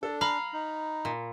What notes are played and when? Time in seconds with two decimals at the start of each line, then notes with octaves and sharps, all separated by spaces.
0.03 D4 A4
0.21 F5 A#5 B5 F#7
0.53 D#4
1.05 A#2